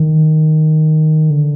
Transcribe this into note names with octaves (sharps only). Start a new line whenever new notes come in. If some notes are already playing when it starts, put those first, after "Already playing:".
Already playing: D#3
D3